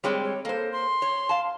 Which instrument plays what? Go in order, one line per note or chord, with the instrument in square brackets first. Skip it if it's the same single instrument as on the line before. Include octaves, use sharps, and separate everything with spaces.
[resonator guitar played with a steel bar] G3 G#3 C4 [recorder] C#5
[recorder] C#5
[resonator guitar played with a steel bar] A#3 C5 [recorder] A4
[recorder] C6
[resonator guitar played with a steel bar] C#5
F5 A5